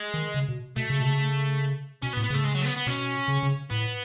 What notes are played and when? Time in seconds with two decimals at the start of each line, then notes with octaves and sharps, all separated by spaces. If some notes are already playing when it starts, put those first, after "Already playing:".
Already playing: G#3
0.14 D#3
0.34 C#3
0.49 B2
0.76 B2 A3
0.90 C#3
1.00 B2
1.04 C#3
2.02 B2 C#4
2.13 B3
2.17 A2
2.24 B3
2.30 C#3 A3
2.44 G#3
2.55 F#3
2.61 A3
2.65 B3
2.76 B3
2.87 B2 C#4
3.28 C#3
3.43 C#3
3.70 A2 B3